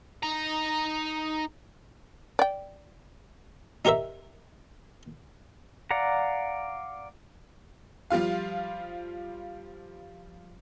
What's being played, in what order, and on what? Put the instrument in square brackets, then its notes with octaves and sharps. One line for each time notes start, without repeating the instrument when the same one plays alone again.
[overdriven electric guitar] D#4 A#5
[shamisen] D5 G5
[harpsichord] D#4 G4 A#4 C5 E5
[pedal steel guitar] D5 F5 F#5 A#5
[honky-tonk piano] F3 G3 F4 F5